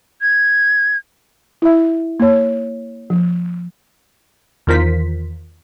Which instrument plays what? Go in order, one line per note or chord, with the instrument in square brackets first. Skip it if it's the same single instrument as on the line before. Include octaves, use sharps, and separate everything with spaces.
[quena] G#6
[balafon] E4 E5
A#3 C#5
F3
[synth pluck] E2 D#3 F4 A#4 C5 B6